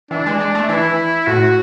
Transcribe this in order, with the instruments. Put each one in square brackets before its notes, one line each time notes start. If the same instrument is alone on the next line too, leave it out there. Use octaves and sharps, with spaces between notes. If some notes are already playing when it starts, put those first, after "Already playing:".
[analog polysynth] E3 [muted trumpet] D4
[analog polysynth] G#3
G#3
A3
[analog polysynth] E3 [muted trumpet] E4
[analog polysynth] A2 [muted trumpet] F#4